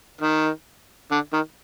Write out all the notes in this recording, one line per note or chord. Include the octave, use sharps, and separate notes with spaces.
D#3
D3
D#3